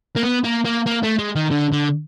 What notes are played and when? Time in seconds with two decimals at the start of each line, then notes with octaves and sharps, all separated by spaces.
0.16 A#3
0.23 B3
0.44 A#3
0.65 A#3
0.87 A#3
1.03 A3
1.19 G#3
1.36 D#3
1.51 D3
1.72 D3